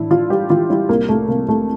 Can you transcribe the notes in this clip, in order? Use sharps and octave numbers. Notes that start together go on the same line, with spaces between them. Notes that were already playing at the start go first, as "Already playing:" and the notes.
Already playing: A2 E3 D4 E4
E3 F4
G3 G4
E3 F4
G3 E4
C2 A#3
C2 A3
C3 A#3
C2 A3